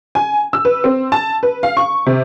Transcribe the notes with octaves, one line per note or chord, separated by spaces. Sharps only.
G#5
E6
B4
C4
A5
B4
F5
C#6
C3